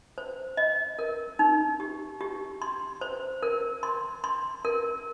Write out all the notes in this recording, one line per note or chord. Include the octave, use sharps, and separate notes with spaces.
C5
D#5
A#4
D#4
G4
G4
C6
C5
A#4
C6
C6
A#4